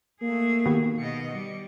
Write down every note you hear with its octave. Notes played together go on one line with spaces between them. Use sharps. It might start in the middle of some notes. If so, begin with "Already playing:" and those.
A3 A#3 G#4
D#3 B3 F#4 G4
B2 D#5 C#7
G3